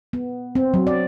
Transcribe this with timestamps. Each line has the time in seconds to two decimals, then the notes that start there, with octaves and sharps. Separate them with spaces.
0.13 B3
0.55 C4
0.74 F#3
0.87 D5